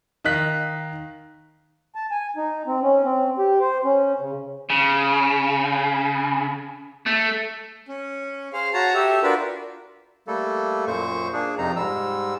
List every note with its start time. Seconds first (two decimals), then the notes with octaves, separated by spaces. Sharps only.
0.24 D#3 D#5 F5 F#6 B6
1.95 A5
2.11 G#5
2.37 D#4
2.66 C4
2.83 C#4
3.04 C4
3.38 G4
3.61 C5
3.84 C#4
4.20 C#3
4.70 C#3
7.06 A3
7.88 C#4
8.53 G#4 C5 F5
8.74 F#4 C#5 A5 A#5
8.94 G4 A4 E5
9.23 D4 F4 F#4 A#4 B4
10.27 G3 A3 A#3 A4
10.87 F#2 A#2 C5 C#6
11.33 A#3 D4 G#4
11.58 F2 C3 F3 D#4 A#5
11.76 G#2 G3 E6